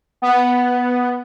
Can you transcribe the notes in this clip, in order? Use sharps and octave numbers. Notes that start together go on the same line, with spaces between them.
B3